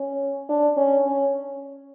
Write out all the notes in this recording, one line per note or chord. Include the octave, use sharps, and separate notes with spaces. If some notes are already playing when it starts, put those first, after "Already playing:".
Already playing: C#4
D4
C#4
C#4